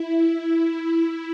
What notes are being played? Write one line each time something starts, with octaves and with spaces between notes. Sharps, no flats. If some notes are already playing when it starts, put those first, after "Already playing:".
Already playing: E4
E4